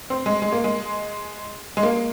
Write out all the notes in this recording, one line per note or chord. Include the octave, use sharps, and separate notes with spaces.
C4
G#3
G#3
A#3
G#3
G#3
A#3